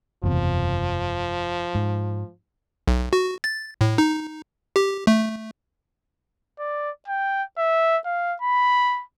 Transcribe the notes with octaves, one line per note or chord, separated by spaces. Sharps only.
F#1 E2 C3 F3
G#2
B1
F#4
A6
A2
D#4
G4
A3
D5
G5
E5
F5
B5